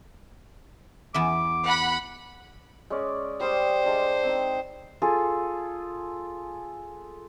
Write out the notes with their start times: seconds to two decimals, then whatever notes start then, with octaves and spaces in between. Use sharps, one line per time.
1.14 E2 B3 E5 D6
1.65 F#5 B5
2.90 G#3 C#4 D5
3.40 G3 C5 C6 D#6
3.84 G#3 D4 D#5
4.23 C4 D#4
5.02 F4 G#4 A4